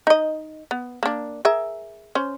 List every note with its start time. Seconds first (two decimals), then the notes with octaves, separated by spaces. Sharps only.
0.07 D#4 D#5
0.71 B3
1.03 A#3 D4
1.45 G#4 A#4 E5
2.15 C#4 C5